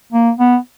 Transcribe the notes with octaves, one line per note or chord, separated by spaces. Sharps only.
A#3
B3